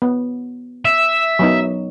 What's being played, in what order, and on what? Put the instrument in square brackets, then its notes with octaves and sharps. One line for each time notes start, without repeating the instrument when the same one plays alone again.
[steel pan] B3
[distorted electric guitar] E5
[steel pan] F#3 B3 D#4